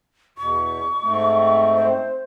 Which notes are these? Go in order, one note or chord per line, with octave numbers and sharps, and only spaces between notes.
E2 B2 C#6
G#2 A3 C4
C5